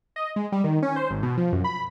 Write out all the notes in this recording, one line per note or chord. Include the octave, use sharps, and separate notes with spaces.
D#5
G#3
G3
D#3
C#4
C5
G#1
B2
F3
F#2
B5